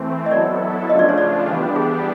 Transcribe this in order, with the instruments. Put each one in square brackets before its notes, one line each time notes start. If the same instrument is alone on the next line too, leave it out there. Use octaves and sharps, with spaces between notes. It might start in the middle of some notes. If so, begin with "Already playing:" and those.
Already playing: [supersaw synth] E3 A3 C4
[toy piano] D#5
[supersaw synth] F#3 B3 E4 A4 [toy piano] D5
[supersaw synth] C#3 F3 A3 D4 F4 [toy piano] D#5
[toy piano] D5
C#5
D5
[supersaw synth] E3 G3 B3 D4 G4
[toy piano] G#4